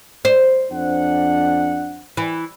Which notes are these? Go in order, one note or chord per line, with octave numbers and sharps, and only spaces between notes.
C5
F2 D4 F#5
E3